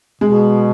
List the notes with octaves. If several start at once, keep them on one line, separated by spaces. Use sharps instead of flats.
B2 G#3